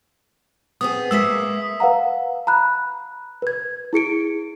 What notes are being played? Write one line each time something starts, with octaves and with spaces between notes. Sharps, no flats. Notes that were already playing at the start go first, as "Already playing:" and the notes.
B3 C4 G#4 D#6
G#3 A#3 E5 E6 B6
B4 F5 F#5 A#5
A#5 B5 F#6
B4 G#6
E4 G#4 C#7 D7